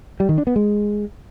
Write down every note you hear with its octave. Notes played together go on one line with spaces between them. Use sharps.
G3
D#3
D4
B3
G#3